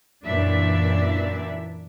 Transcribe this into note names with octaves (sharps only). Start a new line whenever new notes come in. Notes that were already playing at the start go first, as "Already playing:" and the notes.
F#2 A#2 E3 D4 E5